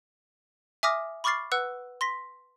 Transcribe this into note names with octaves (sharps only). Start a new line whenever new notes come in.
E5 G#5 D6 D#6 F6 A#6
B5 C#6 D6 F6 A6 C7
B4 F#5 E6 F#6
C6 A#6 B6